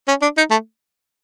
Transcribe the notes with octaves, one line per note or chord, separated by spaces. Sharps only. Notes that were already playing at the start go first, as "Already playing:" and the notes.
C#4
D4
D#4
A3